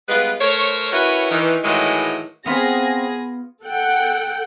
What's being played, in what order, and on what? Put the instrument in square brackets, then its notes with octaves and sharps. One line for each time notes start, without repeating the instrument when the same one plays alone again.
[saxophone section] G3 G#3 B3 F4 B4
A3 A#4 C5 C#5
C#4 E4 F#4 A#4 B4 C#5
D#3 E3
A2 D#3 E3 F#3 G#3
[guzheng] B3 F4 B5 [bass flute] C4 [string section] G#4 A#6
[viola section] A4 F#5 G5